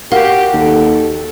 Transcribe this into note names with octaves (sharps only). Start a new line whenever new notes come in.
F#4 G4 A#4 F5
D#2 A4